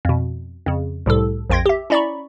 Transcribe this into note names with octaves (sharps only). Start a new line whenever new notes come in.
F2 B2
F2 C#3
C2 A2 C3 A4
A#1 F2 G5 C6 G#6 A#6
G4 E5
C#4 E4 D5 A#5 B5 C#6